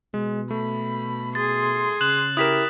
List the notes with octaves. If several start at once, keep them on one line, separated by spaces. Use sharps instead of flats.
B2 G#3
A3 B5
G#4 C6 A6
C#3 F#6 E7 F#7
E4 G4 A#4 D#6 B6 E7